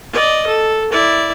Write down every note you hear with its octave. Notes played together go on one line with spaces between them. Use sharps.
D5 D#5
A4
E4 D5